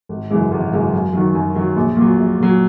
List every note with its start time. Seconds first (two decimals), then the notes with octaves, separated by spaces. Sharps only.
0.09 G#1
0.30 F#2 C#3 E3 G#3
0.51 G#1
0.73 F#2 C#3 E3 G#3
0.93 F#2
1.13 D#3 F#3
1.35 F#2
1.55 D#3 F#3
1.76 A#1
1.97 A#2 F#3
2.17 A#1
2.38 A#2 F#3